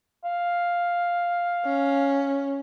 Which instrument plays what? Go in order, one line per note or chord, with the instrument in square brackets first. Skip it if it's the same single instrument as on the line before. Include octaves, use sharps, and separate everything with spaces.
[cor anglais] F5
[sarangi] C#4